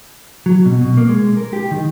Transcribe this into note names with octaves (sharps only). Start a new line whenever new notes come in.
F#3
B2
B2
A#3
G#3
A#4
G4
D#3